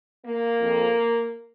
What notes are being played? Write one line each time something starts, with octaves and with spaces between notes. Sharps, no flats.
A#3
F2 F3